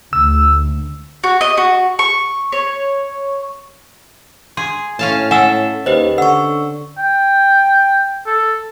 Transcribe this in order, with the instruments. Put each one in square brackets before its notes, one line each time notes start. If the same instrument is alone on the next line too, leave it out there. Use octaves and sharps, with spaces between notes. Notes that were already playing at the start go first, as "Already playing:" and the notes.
[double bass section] D2 [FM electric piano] E6
[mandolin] F#4
D#5
F#4
C#6
C#5
[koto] G#4 [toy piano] C6
[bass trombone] A2 [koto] C#4 F5 A5
[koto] A4 E5 [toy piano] F#5 G#5 E6
[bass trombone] D#2 [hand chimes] G4 B4 D#5 [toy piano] C5
[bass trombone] D3 [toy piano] F#5 [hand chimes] C#6 E6
[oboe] G5
A4